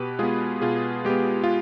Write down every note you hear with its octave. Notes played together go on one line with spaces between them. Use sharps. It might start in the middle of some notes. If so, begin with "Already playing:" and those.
Already playing: B2 G4 B4
G#3 B3 F4 G#4
B2 F4 G#4
G#3 B3 G4
F4